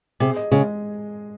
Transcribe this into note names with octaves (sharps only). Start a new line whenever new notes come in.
C3 G#4
D#5
C#3 G#3